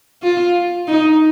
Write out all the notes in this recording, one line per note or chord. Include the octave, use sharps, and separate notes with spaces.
F4
D#4